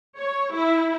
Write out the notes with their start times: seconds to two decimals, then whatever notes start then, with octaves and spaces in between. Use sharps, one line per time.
0.18 C#5
0.53 E4